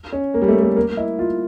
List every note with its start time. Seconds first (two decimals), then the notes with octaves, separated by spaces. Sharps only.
0.12 C#4
0.34 A#3
0.42 G3
0.48 A3
0.62 A3
0.76 A#3
0.97 E4
1.19 F4